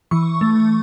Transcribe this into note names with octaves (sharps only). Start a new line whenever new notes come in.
E3 C#6
A3